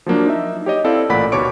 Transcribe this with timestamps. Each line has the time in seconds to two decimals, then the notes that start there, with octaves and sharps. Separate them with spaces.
0.06 F3 F#3 A#3 D4
0.27 D#4 E5
0.66 G4 C#5 D#5
0.84 C4 E4 A4 D5 F5
1.09 A1 A#2 D5 F#5 B5 B6
1.32 D#2 B2 C#5 C#6 D6 D7